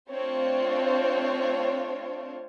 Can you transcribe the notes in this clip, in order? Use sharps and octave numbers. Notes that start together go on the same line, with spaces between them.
A3 C4 D4 F4 C5 C#5